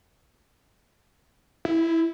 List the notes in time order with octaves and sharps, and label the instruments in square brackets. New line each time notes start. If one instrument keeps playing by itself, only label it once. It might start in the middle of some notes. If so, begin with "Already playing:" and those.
[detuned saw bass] E4